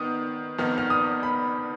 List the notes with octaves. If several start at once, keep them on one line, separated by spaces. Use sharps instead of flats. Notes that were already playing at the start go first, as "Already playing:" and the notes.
Already playing: D#3 B3 D#6
F2 D#3 B3 D#4 F6
F6
D#6
B5